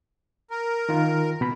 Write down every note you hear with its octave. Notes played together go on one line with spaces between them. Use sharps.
A#4
D#3 F4
B2 B5